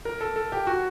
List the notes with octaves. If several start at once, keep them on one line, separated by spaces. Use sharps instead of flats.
A#4
A4
A4
G4
F#4